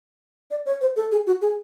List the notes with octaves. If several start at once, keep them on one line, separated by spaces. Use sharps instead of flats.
D5
C#5
C5
A4
G#4
F#4
G#4